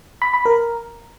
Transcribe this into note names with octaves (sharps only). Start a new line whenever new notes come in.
B5
B5
A#4